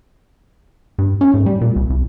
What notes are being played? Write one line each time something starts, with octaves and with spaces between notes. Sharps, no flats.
G2
C#4
G#2
G3
A#2
C2
C2